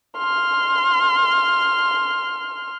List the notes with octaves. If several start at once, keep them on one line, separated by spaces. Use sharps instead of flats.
C6 F6